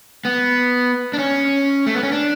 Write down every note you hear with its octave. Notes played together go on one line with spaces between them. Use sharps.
B3
D4
C#4
A3
B3
C#4
D4